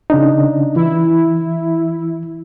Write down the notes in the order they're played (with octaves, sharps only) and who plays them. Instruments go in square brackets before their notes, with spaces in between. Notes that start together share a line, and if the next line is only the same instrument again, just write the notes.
[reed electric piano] C#3 D4 D#4
[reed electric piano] E3 [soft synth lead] E4